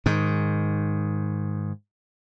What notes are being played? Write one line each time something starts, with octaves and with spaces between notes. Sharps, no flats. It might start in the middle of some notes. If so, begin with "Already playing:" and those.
G#2 D#3